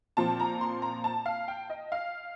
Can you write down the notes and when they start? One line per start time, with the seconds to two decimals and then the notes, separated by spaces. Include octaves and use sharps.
0.17 A#2 F3 C4 A5
0.40 A#5
0.61 C6
0.82 A#5
1.04 A5
1.26 F5
1.48 G5
1.70 D#5
1.92 F5